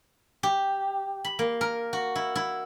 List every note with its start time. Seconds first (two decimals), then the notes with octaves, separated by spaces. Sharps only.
0.43 G4
1.24 B5
1.39 A#3
1.61 A#4
1.93 F#4
2.16 E4
2.35 E4